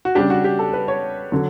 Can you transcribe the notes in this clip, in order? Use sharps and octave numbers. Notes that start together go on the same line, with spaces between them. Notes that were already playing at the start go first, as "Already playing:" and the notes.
F#4
C#3 G3 D4 G4
F#4
G4
A4
B4
C#5
D3 F#3